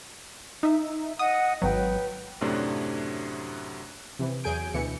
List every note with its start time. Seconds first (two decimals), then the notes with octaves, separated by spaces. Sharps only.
0.63 D#4 E5
1.19 D#5 F#5 D#6
1.62 G#1 F#3 B4 G5
2.41 F#2 A2 C3 F#3 A3 D4
4.19 C3 E3
4.44 E2 F#3 G#4 G#5 G6 D7
4.74 D2 B2 E3 C#7